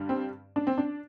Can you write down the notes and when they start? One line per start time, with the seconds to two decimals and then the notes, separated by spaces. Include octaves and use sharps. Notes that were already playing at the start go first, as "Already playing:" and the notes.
Already playing: G2 D3 G3
0.09 C4
0.56 D4
0.67 C4
0.78 D4